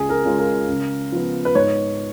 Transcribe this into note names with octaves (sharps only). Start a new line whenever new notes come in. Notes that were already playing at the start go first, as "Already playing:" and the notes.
Already playing: C#2 G#4
A#4
C#3 G#3 C#4 F4
A#4
C#3
F3 B3
B4
G#2 C#5